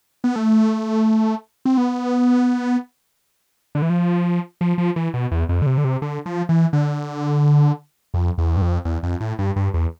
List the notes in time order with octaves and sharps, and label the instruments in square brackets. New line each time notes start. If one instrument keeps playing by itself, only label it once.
[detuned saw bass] B3
A3
C4
B3
D3
E3
F3
F3
F3
E3
B2
E2
F2
D3
C3
D3
C3
D3
F3
E3
D3
F2
E2
G2
F2
E2
F2
A2
G2
G2
E2